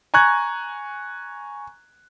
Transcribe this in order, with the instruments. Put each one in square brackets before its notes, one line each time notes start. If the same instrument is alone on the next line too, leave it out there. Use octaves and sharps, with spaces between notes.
[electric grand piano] G#5 A#5 C#6 F#6 G#6